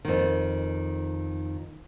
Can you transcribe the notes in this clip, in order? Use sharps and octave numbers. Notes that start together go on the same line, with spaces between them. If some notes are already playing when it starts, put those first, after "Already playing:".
F2 D#3